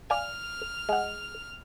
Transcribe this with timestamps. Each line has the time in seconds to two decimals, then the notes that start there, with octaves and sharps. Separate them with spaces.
0.10 D5 F5 G#5 F6
0.89 G#3 F#5